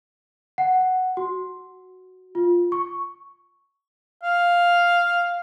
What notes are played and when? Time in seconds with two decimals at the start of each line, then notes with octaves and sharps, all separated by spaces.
0.58 F#5
1.17 F#4
2.35 F4
2.72 C#6
4.23 F5